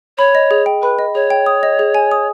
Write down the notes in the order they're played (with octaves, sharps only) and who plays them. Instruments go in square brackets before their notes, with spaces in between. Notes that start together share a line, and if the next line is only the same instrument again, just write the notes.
[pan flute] C#5 [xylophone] B5
[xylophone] D#5
G#4
G5
[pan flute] B4 [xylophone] B5
[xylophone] D#5
[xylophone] G#4 [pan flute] C#5
[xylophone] G5
D#6
D#5
G#4
G#5
D#6